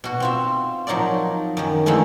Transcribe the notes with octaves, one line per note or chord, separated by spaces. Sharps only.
B2 F#4
C4 F4 E5
F3 F#3 D#4 A#4 D5
F#2 D#3
D3 E3 F3 G#3 A3 D#4